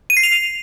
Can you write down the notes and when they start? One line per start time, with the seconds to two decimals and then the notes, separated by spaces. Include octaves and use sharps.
0.10 D#7
0.17 C7
0.23 F7